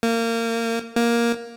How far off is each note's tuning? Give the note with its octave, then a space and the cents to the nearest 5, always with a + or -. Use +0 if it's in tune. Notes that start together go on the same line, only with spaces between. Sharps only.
A#3 -25
A#3 +10